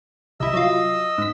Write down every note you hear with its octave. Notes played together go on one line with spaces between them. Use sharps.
C2 E4 D#5 E6
F#3 F4
G#2 B6